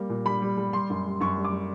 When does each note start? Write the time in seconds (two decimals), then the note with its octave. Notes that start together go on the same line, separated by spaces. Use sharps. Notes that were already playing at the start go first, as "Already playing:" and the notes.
Already playing: G3 A#3
0.09 A#2
0.25 G3 B5
0.42 G3
0.57 G3
0.73 G3 C6
0.90 F#2
1.06 G3
1.20 F#2 C#6
1.37 G3
1.45 D6
1.52 G3